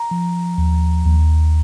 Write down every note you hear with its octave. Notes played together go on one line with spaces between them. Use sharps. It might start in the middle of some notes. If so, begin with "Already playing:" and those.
Already playing: A#5
F3
D#2
D#2